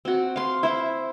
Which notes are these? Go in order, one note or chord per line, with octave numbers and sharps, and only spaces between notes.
C4 F#4
F5 C6
E4 C5